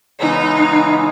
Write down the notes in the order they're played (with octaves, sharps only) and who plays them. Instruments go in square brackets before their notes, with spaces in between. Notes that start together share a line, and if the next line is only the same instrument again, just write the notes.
[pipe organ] C#3 E3 G#3 B3 E4 [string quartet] D#4